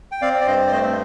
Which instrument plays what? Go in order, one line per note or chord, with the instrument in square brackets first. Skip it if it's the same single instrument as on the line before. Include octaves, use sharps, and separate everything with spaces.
[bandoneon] G5
C4 D5 F5
D5
G2 C5 D#5
D5
A3 C5 D#5